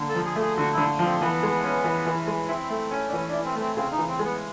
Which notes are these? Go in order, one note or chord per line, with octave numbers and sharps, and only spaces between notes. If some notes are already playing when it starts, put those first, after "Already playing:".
Already playing: D3 A#3
A4
F3
G#4
A3
G#4
D3 F#4
D3 E4
F3
C4
E3 B3
G#3
C#4
E3
E3
G#3
C4 E4
A3
C#4
D4
E3 C#4
D4 E4
C4
A3
C4
C#3 C4
D#4
E3
C4
G#3
B3